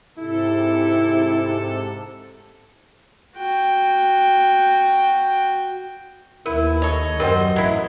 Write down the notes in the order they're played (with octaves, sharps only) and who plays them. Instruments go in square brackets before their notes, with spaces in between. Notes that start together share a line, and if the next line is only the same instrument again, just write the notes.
[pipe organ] G#2 C3 A4 [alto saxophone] E4
[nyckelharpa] F#4 G5
[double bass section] D#2 [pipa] B3 [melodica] E4 [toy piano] A#4
[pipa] A4 C#5 [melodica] D#5
[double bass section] F#2 [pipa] G3 C5 [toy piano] A#4 F#5
[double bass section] A1 [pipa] F#3 E4